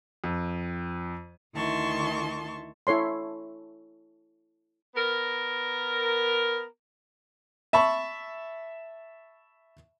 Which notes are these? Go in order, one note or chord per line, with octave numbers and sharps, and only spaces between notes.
F2
D2 D#3 E4 A5 C6 C#6
E4 A4 C#5 C6
B3 A#4
E5 A5 B5 C#6